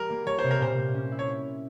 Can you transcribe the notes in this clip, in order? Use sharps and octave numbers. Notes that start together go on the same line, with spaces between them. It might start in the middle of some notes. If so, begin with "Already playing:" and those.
Already playing: G3 A#4
A#3
G3 C#5
C3 C5
A#4
A#2 C5
A#2
C#4
E4
C#5